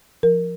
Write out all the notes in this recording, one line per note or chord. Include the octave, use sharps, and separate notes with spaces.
F3 A#4